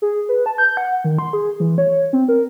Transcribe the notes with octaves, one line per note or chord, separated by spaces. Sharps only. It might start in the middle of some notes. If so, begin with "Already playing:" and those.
G#4
B4
A5
G6
F#5
D#3
C6
G#4
E3
C#5
C4
A#4